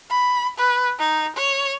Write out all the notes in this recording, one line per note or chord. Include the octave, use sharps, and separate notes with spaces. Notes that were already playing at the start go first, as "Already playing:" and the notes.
B5
B4
D#4
C#5